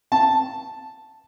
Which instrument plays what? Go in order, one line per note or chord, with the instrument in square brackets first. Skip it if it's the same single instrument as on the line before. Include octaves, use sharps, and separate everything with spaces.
[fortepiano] A5